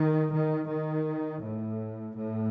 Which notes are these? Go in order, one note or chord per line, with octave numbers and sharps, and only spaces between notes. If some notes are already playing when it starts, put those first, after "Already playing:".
Already playing: D#3
D#3
D#3
A2
A2